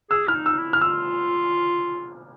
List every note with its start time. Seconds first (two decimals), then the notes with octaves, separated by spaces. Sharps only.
0.11 G#4 E6
0.28 E4 F6
0.34 D#4
0.46 E6
0.58 E4
0.73 F6
0.81 F4 E6